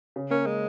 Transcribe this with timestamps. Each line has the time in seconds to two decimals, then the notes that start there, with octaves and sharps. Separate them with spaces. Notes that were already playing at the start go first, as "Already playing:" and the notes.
0.16 C#3
0.30 A#3 C#4
0.46 G#3